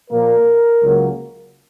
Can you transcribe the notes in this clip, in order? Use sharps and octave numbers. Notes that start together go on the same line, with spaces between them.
A#2 F3 A#3 A#4
C#2 C#3 F#3 A#3